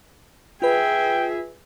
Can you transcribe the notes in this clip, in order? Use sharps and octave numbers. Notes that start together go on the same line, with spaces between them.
F4 G#4 B4 E5 G5